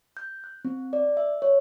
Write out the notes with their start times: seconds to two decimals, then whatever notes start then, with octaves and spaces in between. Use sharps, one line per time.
0.17 G6
0.44 F#6
0.65 C4
0.93 D5
1.17 E5
1.42 C#5